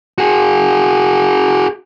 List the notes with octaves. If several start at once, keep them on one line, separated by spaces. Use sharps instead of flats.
F#4 G#4